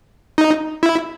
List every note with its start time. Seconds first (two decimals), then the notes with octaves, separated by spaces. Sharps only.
0.38 D#4
0.83 E4